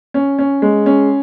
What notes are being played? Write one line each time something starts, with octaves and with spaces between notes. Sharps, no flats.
C#4
C#4
G#3
C#4